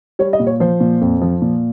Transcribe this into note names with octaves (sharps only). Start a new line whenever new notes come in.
G3 C#5
D#5
A#2
C#5
F3 C5
A#2
F2
F3
A#2